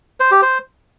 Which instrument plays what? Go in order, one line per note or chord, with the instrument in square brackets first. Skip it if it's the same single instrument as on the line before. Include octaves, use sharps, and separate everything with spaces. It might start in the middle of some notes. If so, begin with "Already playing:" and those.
[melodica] C5
G4
C5